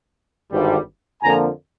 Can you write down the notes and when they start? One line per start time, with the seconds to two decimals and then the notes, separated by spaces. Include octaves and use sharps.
0.52 G#1 G2 D3 G3
1.22 F2 D3 F3 A#3 G#5 A#5